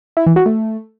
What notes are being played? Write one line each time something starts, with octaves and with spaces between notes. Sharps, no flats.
E4
E3
F#4
A3